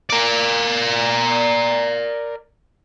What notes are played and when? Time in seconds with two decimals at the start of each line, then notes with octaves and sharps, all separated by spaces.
0.10 A#4 D5